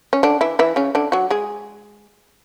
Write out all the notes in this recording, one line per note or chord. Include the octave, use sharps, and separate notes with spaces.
C#4
D3 D4
E3 E4
E3 E4
C#3 C#4
D3 D4
F#3 F#4
G#3 G#4